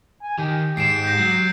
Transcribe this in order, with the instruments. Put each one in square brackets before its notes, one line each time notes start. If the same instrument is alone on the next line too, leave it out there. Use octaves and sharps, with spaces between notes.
[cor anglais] G#5
[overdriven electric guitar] D#3 [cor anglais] G4
[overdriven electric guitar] G#2 G#3 [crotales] C7 D7 E7
[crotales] G6 A#6
[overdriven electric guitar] F#3